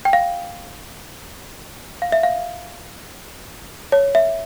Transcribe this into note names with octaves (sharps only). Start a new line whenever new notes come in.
G5
F5
F5
E5
F5
C#5
E5